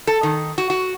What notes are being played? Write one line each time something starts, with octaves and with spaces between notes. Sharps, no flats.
A4
D#3
F#4
F#4